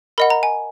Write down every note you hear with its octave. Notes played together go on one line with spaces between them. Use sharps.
A#4 D#5 F#5 B5
A#5
G#5